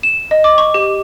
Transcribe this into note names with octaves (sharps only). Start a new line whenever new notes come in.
E7
D#5
D6
C#6
G4